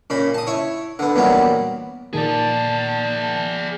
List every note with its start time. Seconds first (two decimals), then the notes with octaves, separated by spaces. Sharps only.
0.10 A#2 C#3 B5
0.34 A5 D#6
0.47 E4 C#5
0.99 D3 B3
1.16 E2 A#2 F#3 G3 B3
2.13 A#2 D#3 A#3 G#4 D5 A5